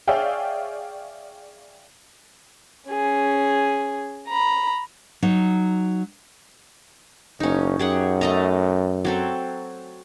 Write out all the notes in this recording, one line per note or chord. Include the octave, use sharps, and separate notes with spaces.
G#4 C#5 D5 E5 F5 G5
C#4 G#4
A#5 B5
F#3 D#4
F#1 C#4 D#4
F#2 G4 G#4 F#5
A3 D#5 A#5
F#3 C4 A4